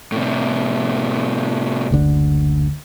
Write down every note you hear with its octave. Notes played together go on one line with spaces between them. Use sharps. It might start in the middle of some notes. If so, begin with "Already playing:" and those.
A2 C3
F#1 D2 D3